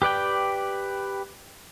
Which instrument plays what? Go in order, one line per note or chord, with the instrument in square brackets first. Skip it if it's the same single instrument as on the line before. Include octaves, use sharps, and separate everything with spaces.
[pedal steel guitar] G4 B4 D5 G5